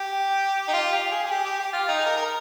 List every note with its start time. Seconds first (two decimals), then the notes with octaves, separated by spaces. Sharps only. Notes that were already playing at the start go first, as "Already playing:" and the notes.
Already playing: G4
0.68 D#4
0.73 F4
0.92 G4
1.11 G#4
1.26 G#4
1.31 G4
1.44 G4
1.60 G4
1.73 F4
1.88 D#4
1.99 G#4
2.06 A#4
2.17 A#4